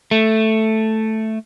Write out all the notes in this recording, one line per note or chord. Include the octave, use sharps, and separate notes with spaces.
A3